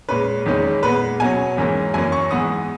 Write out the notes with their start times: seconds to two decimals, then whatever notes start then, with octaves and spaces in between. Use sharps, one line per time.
0.09 A#2 G#3 C#4 B4
0.46 E2 D#3 G#3 C#4
0.83 A#2 G#3 B3 B4
1.20 B2 F#3 C#4 G#5
1.57 G#2 E3 A#3 C#4
1.94 F#2 E3 A#3 C#4 G#5
2.12 C#6
2.31 G#2 E3 B3 D#6